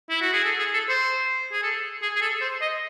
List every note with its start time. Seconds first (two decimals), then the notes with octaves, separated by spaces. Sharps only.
0.10 E4
0.22 F#4
0.33 G#4
0.45 A4
0.59 G#4
0.74 A4
0.89 C5
1.52 G#4
1.63 A4
2.02 G#4
2.16 G#4
2.22 A4
2.41 C5
2.61 D#5